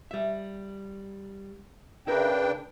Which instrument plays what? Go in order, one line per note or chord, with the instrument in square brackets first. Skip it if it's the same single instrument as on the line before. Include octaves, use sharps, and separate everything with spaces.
[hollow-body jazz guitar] G3 E5
[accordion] C#3 D4 G5 [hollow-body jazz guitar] E4 A#4 [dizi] B4